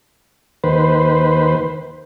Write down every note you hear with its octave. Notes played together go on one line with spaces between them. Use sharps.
D#2 B4 C5